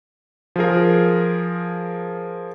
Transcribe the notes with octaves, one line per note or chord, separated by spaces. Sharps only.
F3 F4 G#4 A#4